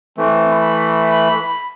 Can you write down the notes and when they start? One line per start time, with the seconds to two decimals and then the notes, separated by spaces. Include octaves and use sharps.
0.18 E3 A3 C4
0.50 B5